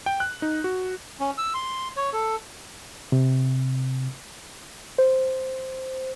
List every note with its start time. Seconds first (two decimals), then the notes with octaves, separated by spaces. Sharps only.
0.06 G5
0.20 F#6
0.42 D#4
0.64 F#4
1.20 C#4
1.38 E6
1.54 C6
1.97 C#5
2.13 A4
3.12 C3
4.98 C5